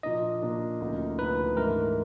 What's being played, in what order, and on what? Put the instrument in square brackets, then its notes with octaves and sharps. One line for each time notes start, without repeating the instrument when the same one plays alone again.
[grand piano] A#2 F3 A#3 D4 [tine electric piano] D#5
[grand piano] A#2 F3 A#3 D4
D2 C#3 F3 A#3 D#4
[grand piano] D2 C#3 F3 A#3 D#4 [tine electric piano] B4
[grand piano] G#2 E3 A3 D4 [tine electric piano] A#4